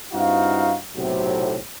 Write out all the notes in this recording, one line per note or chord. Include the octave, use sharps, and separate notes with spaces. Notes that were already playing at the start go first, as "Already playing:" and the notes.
G2 C4 D#4 E4 F#4 F5
B1 A2 C3 F#3